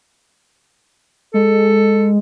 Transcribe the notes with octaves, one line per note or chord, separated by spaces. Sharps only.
G#3 A4